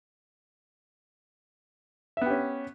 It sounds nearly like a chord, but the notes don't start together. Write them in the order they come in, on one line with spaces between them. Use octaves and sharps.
E5 B3 G4 C#4